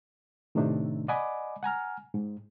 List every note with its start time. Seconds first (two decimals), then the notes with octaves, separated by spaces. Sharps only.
0.55 A2 C3 D#3 A3 D4 D#4
1.08 D5 D#5 F#5 G#5 B5 D6
1.63 F#5 G#5 A#5 F6
2.14 G#2